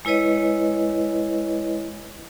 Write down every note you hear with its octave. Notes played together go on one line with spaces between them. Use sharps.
G#3 E4 B4 C#5 D#5